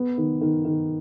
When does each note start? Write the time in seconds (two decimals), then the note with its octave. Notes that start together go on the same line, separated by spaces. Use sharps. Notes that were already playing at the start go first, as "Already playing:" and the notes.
Already playing: B3
0.18 D#3
0.41 D#3
0.65 D#3